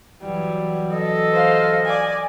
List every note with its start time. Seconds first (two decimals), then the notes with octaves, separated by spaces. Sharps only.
0.22 E3 F#3 G3
0.92 A4 D#5
1.32 C5 F5
1.85 D5 G#5